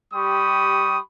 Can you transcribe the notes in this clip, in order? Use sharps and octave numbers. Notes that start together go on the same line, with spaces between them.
G3 G4 B5 C#6 D#6